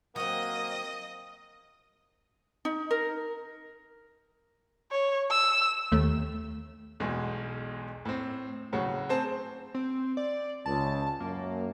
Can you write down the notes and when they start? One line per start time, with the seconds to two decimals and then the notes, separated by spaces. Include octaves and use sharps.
0.16 F#3 A#3 C4 D#5 D#6
2.65 D#4
2.91 A#4
4.92 C#5
5.31 E6
5.92 D#2 A3
7.00 B1 E2 B2 G#3
8.05 A2 C4
8.73 A2 C#3 F#3 F#4
9.09 C4 G#4 C5 A5
9.74 C4
10.17 D5
10.66 C#2 A5
11.20 F#2 A#3